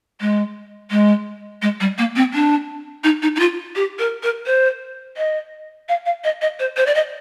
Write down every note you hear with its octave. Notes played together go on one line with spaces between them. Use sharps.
G#3
G#3
G#3
G3
A#3
C4
D4
D#4
D#4
D#4
F4
G4
A#4
A#4
C5
D#5
F5
F5
D#5
D#5
C5
C5
D5
D#5